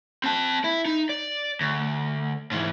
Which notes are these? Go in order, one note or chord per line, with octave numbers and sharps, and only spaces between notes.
C4 A5
E4
D#4
D5
D2
G#2 E3